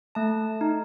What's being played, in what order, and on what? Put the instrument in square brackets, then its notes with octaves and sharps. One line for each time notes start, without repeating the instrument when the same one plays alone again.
[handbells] A3 A5
D#4